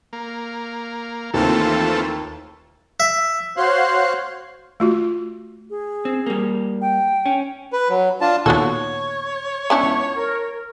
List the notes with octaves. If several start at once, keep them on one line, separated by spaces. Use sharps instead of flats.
A#3
D#2 E3 A3 C4 F4 A4
E5
F#4 C5 C#5 F5 C6 F#6
A3 F4 F#4
G#4
C4
G3 A#3
G5
C#4
B4
F#3
D4 F4 A5
D#2 A#2 B3 F#4 A4 C#5
C#2 B3 C#4 D4 E4 C#6
A#4